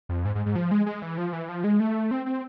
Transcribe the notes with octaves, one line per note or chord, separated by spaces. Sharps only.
F2
G#2
G#2
G#2
F3
G#3
G#3
E3
F3
E3
F3
G#3
A3
C4
C4